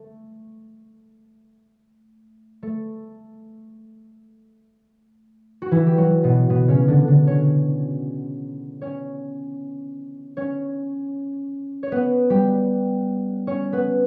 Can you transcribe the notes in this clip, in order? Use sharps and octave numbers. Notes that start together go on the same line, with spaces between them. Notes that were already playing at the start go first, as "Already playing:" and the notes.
Already playing: A3
A3 A4
F#4
E3 E4
G4
F#3 F#4
B2 B3
B2 B3
C#3 C#4
D3 D4
D3 D4
C#4 C#5
C#4 C#5
C#4 C#5
C#5
B3 B4
G3 G4
C#4 C#5
B3 B4